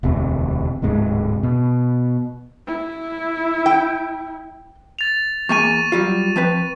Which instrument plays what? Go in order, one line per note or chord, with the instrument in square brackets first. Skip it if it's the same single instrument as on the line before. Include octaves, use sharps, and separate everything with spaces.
[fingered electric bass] E1 D2 C3 C4
D1 G#2 C3 G#3
B2
[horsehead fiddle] E4
[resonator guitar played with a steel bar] G5
[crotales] A6 F7
[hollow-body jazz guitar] E2 A#3 G#5 [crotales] C#6 D#7
[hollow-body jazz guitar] F#3 G3 F4
F3 C4 B4